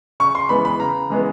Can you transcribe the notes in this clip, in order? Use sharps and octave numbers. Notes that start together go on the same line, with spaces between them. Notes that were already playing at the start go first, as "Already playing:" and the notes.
C#3 C#6
C6
E3 G#3 B3 B5
B5
C#3 A#5
E3 G#3 B3